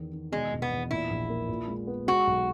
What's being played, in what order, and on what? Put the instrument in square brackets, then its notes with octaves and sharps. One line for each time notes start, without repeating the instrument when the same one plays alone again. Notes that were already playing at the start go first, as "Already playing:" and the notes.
Already playing: [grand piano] E2 D#3
D#3
[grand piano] B2 [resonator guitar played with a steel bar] G#3
[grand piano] E1
[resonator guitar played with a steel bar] B3
[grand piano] E2
[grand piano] A#2 [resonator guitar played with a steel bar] E4
[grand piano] A#1
A#3
A#2
G#3
B3
[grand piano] G#3 [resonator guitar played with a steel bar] F#4
[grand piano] B1